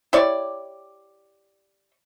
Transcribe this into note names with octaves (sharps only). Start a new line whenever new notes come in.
E4 G4 C#5 D5